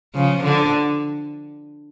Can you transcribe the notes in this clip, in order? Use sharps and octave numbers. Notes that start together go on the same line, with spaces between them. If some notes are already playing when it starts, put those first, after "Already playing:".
C#3 F3
D3